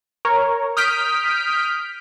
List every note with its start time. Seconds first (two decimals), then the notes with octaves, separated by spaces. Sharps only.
0.25 A#4 C#5
0.77 D#6 F6 G6 B6 D7